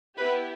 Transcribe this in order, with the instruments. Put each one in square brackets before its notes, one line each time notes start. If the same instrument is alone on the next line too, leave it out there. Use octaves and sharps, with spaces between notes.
[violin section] B3 E4 G4 B4